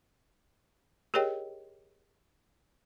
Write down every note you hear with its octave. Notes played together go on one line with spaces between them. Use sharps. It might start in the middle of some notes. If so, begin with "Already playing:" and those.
G4 G#4 A#4 C#5 D#5 G5